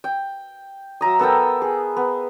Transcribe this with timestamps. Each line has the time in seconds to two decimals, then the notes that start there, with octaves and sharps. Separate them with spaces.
0.04 G5
1.01 F#3 E5 A#5 D#6
1.19 B3 A4 A#4 G5
1.62 G#4
1.97 B3